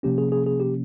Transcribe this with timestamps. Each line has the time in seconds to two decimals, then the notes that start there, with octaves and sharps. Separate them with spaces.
0.03 C3 F3 A#3 C#4 G4
0.18 G#4
0.32 G#4
0.46 G#4
0.60 G4